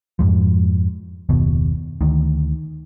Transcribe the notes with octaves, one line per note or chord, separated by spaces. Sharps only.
F2 G#2 F3
F#1 D#2 B2
D2 D#3